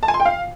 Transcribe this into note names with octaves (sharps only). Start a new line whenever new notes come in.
A5
G#5
C6
G5
F5